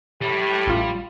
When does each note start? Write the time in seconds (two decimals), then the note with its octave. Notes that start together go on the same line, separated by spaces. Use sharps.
0.21 A2 G3 G4
0.66 A1 F4